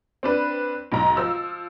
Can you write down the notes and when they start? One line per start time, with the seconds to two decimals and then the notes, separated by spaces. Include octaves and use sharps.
0.23 C4 D4 B4
0.92 B1 G#2 A#5
1.17 F3 E6